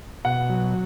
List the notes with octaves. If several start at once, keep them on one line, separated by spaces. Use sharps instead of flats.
B2 F#5
F#3